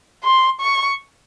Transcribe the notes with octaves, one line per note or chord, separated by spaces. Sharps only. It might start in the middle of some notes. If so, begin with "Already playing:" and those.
C6
C#6